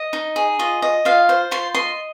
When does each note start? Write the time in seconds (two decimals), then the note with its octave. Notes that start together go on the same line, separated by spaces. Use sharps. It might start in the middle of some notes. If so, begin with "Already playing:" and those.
Already playing: D#5
0.13 D#4
0.36 G#4
0.59 F4 D#5
0.82 D#5
1.05 F4 F5
1.29 C5
1.51 F4 C6
1.75 D#5 C6